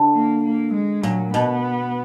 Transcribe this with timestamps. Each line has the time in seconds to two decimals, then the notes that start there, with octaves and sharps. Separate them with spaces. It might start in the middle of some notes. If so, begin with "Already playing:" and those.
Already playing: D3
0.14 A#3
0.43 A#3
0.74 G#3
1.03 A#2 F#3
1.33 B2 B3